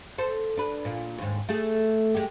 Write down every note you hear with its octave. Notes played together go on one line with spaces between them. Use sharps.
A4 C5
D4 B4
A#2
D#2 G#2
A3 G#4
G#3 G4